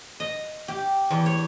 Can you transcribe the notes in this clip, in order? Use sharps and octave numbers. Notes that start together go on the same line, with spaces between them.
D#5
G4
E2
C#5